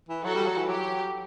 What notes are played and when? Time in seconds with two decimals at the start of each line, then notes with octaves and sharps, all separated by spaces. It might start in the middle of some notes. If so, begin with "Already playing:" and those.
0.09 E3
0.24 F#3 F#4 A4
0.35 G3
0.47 F#3
0.57 E3
0.68 F#3 G4